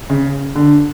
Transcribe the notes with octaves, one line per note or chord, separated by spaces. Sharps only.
C#3
D3